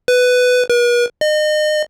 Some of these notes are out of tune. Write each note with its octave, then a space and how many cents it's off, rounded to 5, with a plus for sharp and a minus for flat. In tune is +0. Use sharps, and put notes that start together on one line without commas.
B4 +10
B4 -45
D#5 -35